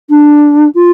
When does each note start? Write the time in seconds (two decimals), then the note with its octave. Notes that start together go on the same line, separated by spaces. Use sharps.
0.09 D4
0.74 F4